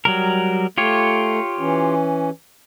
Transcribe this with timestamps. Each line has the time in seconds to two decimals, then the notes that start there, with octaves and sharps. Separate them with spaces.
0.05 F#3 G3 A#4
0.78 A3 F4 G4 C#5
1.59 E3 C#4